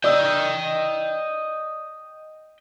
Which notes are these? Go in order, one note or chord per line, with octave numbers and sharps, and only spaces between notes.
D5 D#5 G5 E6